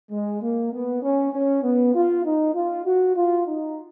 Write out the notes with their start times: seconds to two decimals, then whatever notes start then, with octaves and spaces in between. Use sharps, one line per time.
0.11 G#3
0.42 A#3
0.72 B3
1.02 C#4
1.33 C#4
1.63 B3
1.95 F4
2.25 D#4
2.55 F4
2.86 F#4
3.16 F4
3.47 D#4